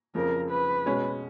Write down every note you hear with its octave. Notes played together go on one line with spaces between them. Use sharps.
F2 C#3 F3 A#4
B4
B2 G#3 C#4